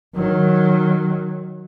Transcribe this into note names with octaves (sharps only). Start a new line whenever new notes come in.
D#3 F#3